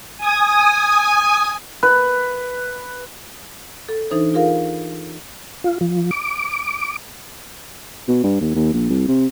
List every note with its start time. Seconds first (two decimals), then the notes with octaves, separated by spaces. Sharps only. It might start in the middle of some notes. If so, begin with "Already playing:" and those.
0.17 G#5 D#6
1.83 B4
3.89 A4
4.11 E3 D4 D#4 A4 C5
4.34 F4 G#4 A#4 F5
5.64 F4
5.81 F3
6.11 D6
8.08 B2
8.23 G2
8.41 D#2
8.55 D#2
8.74 A#1
8.90 C2
9.08 C3